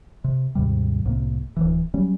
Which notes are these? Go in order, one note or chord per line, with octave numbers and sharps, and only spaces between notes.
C3
D#2 G#2 C3 G3
C2 A2 C3 A#3
D1 G1 E3
F#3 G3 C#4